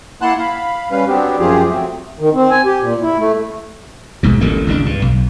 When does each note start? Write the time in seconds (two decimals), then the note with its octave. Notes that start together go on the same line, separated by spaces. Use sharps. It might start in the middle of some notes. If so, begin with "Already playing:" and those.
0.22 A#3 E4 F#5 A5 C6 F#6
0.39 F5 B5
0.91 G3 C#4 B4 F5
1.08 F#3 B3 C4 D4 G4
1.39 F#2 F3 F4 G4 G#4
1.69 F#3 A3 C4
2.20 D#3
2.34 C4
2.51 G#5
2.65 G4
2.81 A#2
3.01 E4
3.18 A3
4.23 B1 G#2 B2
4.41 A1 D2 A3 A#3
4.67 G#1 C#2 C3 D4
4.86 G2
5.02 B1